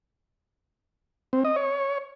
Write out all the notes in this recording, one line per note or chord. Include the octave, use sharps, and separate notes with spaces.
C4
D#5
C#5